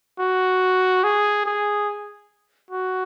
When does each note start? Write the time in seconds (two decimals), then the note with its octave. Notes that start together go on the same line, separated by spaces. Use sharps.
0.20 F#4
1.04 G#4
1.46 G#4
2.71 F#4